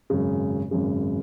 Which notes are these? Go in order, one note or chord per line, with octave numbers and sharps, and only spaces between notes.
G#1 F#2 C#3
G#1 F#2 C#3